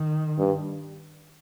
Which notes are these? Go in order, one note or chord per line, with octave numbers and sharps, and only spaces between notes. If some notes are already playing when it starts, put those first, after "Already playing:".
Already playing: D#3
G2